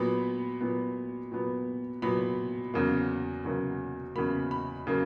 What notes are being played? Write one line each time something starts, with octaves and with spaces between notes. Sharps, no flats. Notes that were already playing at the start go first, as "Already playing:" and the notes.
Already playing: A#2 F#3 B3 B5
A#2 F#3 B3
A#2 F#3 B3
A#2 F#3 B3 B5
E2 C#3 F#3 A#3
E2 C#3 F#3 A#3
E2 C#3 F#3 A#3 B5
B5
C#3 F#3 A#3